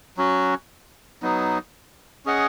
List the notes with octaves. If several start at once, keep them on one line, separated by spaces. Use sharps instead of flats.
F#3 C#4 F#4
F#3 B3 D#4
C#4 G#4 D#5 F#5